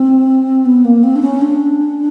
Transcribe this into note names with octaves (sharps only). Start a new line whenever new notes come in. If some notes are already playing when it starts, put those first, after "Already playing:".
Already playing: C4
B3
A#3
C4
D4
C#4
D4